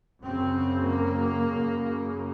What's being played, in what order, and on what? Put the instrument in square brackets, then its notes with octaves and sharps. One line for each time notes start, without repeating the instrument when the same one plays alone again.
[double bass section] F#2 C#3 C4
A#3
F#2 C#3